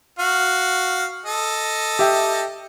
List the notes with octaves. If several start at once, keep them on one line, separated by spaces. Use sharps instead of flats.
F#4 F5
A4 D#5
G4 E5 G5